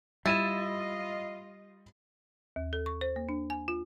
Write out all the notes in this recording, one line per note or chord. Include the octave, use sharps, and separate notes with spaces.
G3 E4 F4 D#5 A6 D#7 E7
D#2
A4
C#6
C5
A#3
D4
G#5
F4